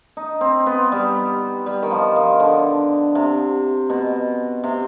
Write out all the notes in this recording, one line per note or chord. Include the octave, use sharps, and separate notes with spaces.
D#4
C4
B3
G3
G3
D#3
F3
D#3
D3
C3
B2
C3